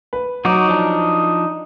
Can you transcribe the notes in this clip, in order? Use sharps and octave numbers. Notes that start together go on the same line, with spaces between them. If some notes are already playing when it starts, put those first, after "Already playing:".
B4
F#3 D#4 F#4 D6
F3 D4